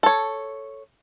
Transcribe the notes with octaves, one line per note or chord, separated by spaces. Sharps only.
A4 C#5